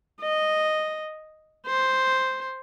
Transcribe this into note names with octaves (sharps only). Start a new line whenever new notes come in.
D#5
C5